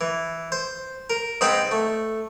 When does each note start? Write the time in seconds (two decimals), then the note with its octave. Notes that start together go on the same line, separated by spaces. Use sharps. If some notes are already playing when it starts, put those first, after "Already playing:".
0.01 E3
0.52 C5
1.10 A#4
1.41 G#2 C4 D#4 B4 B5 D#6
1.71 A3